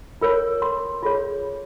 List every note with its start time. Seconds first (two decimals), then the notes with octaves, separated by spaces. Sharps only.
0.21 F4 A#4 C#5
0.62 C6
1.03 F4 G#4 C#5